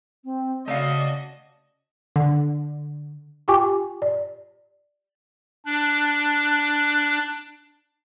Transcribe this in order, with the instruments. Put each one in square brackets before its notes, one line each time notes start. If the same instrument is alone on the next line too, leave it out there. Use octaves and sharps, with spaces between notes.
[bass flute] C4
[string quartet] C#3 F#4 A5 [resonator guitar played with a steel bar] A3 F5 [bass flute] D5 [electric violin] D#5
[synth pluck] D3
[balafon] F4 G4 G5 G#5 C#6 D6
D5
[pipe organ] D4 F#6